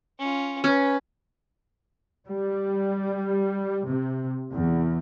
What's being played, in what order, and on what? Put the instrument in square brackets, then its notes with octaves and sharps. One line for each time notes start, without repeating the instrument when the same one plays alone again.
[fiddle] C#4 F4
[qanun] C#4 [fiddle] B4
[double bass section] G3
C3
E2